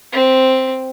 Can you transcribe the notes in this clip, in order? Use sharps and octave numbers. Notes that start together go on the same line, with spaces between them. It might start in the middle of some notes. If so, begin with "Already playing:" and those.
C4